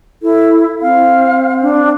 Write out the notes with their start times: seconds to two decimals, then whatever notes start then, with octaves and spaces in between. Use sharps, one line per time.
0.23 E4 A4
0.82 C4 F5
1.61 D4